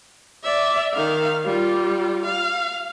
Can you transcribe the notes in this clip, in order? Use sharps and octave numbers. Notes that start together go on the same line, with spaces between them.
D5 E5
D#3 F5
G3 F4
F5